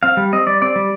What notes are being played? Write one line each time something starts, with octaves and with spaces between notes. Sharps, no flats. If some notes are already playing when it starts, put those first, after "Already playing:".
C4 F5
G3
C4 D#5
G3 D5
C4 D5
G3